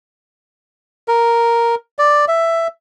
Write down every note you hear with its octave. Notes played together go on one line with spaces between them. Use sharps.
A#4
D5
E5